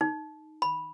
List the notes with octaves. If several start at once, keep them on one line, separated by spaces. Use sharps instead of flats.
D#4
B5